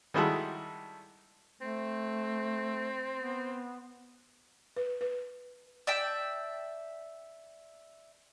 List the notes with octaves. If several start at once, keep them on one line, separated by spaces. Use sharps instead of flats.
D#3 G3 G#3 E4 F#4 A4
A3 C4
B3
B4
B4
D5 E5 G5 A5